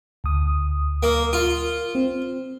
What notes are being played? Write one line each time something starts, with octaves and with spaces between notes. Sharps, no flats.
D2 D#6
A#3
F4
C4